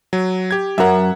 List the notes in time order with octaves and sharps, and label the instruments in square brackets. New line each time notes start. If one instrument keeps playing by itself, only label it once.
[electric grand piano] F#3
G4 G#6
[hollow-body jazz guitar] F#2 A#4 [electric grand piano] E5 F#5